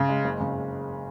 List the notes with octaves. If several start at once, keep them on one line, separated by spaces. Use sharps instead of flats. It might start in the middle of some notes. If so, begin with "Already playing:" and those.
Already playing: C#3
G#3
F#1
C#3